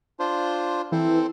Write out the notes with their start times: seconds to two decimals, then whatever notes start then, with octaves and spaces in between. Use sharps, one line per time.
0.19 D4 F4 C5
0.92 E3 C4 A4 C5